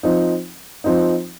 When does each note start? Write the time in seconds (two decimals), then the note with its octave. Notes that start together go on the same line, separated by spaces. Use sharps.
0.03 F3 C4 D#4
0.84 F3 C4 D#4